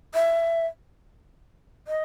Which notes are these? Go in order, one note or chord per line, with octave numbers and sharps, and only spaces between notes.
E5
D#5